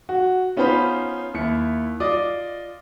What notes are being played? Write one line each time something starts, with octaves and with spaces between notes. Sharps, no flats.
F#4
B3 C#4 D#4 F4 C5 B5
D#2 E4 C#7
F4 D5 D#5 D6